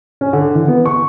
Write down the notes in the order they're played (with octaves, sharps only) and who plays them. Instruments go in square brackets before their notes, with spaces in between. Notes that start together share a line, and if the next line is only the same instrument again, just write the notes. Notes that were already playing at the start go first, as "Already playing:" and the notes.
[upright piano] C#4
D3
E3
B3
C#6